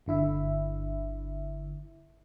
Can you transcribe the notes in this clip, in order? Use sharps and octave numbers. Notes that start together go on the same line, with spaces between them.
G1 D3 E4 E5